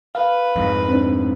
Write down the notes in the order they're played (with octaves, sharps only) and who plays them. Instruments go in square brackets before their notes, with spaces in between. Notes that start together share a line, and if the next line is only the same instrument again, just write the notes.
[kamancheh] B4 [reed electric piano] F5
[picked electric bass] F2 G#2
[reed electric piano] C4 D4